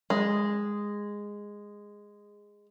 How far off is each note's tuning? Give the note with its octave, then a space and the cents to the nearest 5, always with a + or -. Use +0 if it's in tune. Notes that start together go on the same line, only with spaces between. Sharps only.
G#3 -10